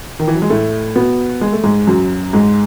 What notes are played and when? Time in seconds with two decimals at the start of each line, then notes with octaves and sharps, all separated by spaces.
0.19 D#3
0.27 E3
0.35 F#3
0.42 G#3
0.50 A2 A3
0.95 B2 B3
1.41 G#3
1.53 A3
1.63 G#2 G#3
1.87 F#2 F#3
2.33 G#2 G#3